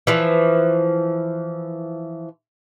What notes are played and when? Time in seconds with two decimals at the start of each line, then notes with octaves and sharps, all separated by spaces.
0.07 E3 F3